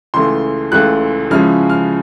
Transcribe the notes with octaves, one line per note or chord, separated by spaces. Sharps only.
C#2 C#3 E3 A3 C6
C#2 C#3 E3 A3 F#6
C#3 F3 G#3 C#4 E4 F6
F6